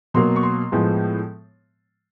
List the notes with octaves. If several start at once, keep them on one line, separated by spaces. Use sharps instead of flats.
B2 F#3 A#3 C6
C#6
C6
A2 F3 G#3 B3